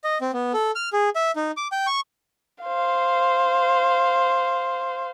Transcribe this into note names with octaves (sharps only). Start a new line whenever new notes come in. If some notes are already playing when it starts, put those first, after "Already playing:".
D#5
C4
B3
A4
F6
G#4
E5
D#4
D6
G5
C#6
C5 F5